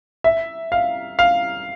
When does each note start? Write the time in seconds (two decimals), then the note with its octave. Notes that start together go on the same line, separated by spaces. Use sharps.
0.24 E5
0.72 F5
1.19 F5